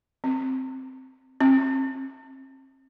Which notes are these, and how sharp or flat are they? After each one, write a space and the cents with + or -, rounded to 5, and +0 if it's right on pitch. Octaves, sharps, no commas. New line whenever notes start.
C4 +0
C4 +35